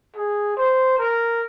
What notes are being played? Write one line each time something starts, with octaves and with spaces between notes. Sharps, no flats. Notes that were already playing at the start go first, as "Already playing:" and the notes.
G#4
C5
A#4